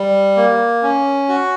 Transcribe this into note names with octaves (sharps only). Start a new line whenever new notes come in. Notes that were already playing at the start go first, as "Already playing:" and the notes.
Already playing: G3
A#3
C#4
F#4